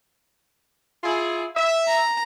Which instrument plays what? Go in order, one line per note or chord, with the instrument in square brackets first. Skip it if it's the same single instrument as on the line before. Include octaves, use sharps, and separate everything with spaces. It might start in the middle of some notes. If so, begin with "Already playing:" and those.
[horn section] E4 F4 G#4
E5
[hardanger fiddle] A#5